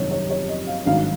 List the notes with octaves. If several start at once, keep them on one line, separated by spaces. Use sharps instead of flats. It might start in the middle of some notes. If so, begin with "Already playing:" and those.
Already playing: F#1 F2 C3 D#3 G3 C#5
C#5
C#5
D#5
F5
G#1 G2 D#3 F#3 F5